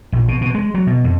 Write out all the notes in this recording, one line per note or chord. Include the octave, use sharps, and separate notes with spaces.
A#1
B2
B2
G#3
F#3
B2
F2